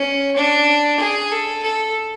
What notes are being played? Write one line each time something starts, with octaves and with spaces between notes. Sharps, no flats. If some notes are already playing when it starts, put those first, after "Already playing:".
Already playing: C#4
D4
G#4
A4
A4